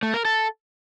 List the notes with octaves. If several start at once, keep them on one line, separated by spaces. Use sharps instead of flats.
A3
A#4
A4